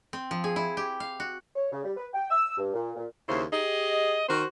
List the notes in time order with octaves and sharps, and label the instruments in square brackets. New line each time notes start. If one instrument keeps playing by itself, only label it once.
[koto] C4
F3
G#4
E4
G4
F5
F#4
[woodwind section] C#5
C#3
G3
B4
G5
E6
G2
A#2
A#2
[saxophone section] D#2 C#3 E4 C5
G4 G#4 D#5
D#3 F#4 C5